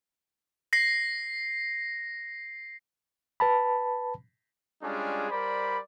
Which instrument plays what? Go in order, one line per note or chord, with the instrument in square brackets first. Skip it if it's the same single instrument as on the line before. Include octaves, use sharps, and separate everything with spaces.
[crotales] A#6 C7
[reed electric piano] B4 A5 B5
[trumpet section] G3 G#3 C#4 D4 F4 G#4
G3 A#4 C5 D5 B5